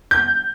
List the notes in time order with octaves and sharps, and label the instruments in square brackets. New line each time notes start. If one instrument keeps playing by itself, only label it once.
[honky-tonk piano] G6